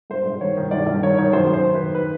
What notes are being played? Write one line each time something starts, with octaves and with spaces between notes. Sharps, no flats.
G2 C5
G2
D#3 C#5
D#3
G2 D5
G2
D#3 C#5
D#3 C#5
F#2 C5
F#2 C5
D#3
B4
D#3
B4